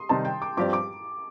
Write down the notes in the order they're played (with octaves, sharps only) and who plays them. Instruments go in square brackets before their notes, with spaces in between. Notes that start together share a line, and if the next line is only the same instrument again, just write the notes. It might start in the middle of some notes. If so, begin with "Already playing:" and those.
Already playing: [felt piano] C6 D#6
[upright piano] C3 D#3 G3 C4 D#4 [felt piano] A5
[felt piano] G5
D6
[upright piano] G2 F3 C4 G4 D5 [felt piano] D6
[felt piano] D6